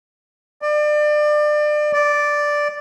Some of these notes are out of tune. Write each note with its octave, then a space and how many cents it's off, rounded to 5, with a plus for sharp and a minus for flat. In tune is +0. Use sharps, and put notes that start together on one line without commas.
D5 +30
D5 +0